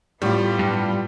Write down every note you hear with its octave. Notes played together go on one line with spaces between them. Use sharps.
A2 G3 B3 F4 G4
G2